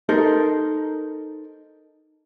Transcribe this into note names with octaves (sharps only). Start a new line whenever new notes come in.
D#4 A4 A#4 C5